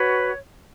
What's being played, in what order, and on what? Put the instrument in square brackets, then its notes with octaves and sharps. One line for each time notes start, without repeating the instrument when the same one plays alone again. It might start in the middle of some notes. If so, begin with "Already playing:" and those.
Already playing: [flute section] F#4 B4 C#5